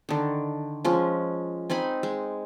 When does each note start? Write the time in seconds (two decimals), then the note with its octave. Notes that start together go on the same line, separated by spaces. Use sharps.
0.09 D3 D#3
0.85 F3 G#3 C#4
1.70 C4 D#4 G#5 B5
2.03 G#3